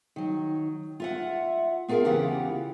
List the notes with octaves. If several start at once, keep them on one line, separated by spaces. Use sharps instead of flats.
D#3 F#3
F4 E5 F#5
B3 F4 G#4 A#4 E5 F5
E2 C#3 E3 F4 G4 F#5